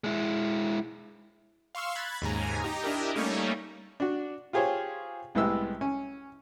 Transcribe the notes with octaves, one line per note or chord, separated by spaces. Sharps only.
G#3 E4
F5 C6 C#6 E6 F6
B5 F#6 G#6 A6
D#2 G#2 C#3 G#5 A#5
D#4 G4 A#5
D4 E4 G4 A#4 D#5
G3 A3 A#3 C#4 D#4 C#5
D4 F#4
F4 G4 G#4 C5 C#5
C2 A2 G#3 B3 G4 E6
C#4